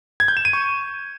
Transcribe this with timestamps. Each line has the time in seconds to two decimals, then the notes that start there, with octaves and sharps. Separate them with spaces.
0.20 G#6
0.28 G6
0.37 E7
0.45 D#7
0.53 C#6